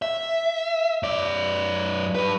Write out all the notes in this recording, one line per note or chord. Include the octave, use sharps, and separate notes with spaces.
E5
F#2 D5
G3 B4